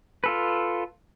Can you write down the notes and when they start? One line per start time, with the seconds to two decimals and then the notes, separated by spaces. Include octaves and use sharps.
0.24 F4 A4 B4